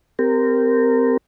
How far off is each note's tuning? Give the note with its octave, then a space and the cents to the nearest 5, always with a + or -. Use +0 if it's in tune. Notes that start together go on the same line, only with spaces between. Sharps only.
C4 -25 G4 +0 A#4 -15